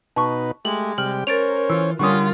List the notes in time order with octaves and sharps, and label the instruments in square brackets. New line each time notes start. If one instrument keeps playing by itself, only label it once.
[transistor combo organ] B2 D#4 B4 [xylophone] A5 C#6
[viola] G#3 [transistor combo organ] A3 G4 [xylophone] F#7
[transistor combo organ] C3 G3 G5 [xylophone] F6 F#7
[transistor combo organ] C#4 C5 C#5 [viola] A#4 [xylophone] A6 D7 F7
[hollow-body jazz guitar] E3 [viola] F4 [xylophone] E6
[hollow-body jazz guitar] D3 G3 C#4 [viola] F4 A#4 [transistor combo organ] F#5 [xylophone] C#6 D#6